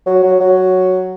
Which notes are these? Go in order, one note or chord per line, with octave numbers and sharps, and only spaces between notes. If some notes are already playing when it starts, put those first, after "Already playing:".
F#3
F#3
F#3